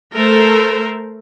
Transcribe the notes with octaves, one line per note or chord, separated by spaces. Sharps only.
A3 A4 A#4 C5